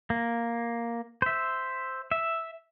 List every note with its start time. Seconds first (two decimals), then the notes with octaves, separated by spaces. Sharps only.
0.10 A#3
1.22 C5 E5
2.11 E5